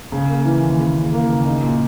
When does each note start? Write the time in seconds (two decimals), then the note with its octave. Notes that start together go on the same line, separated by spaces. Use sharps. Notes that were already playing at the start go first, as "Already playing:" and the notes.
0.12 C#3
0.29 A#3
0.45 E3
0.63 D#2
0.79 C#3
0.96 C#3
1.12 A#3
1.29 C#3
1.46 D#4
1.63 A#2